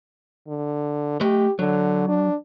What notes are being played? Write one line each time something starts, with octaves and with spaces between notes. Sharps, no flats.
D3
A3 G4 D#5
D3 F#3
D4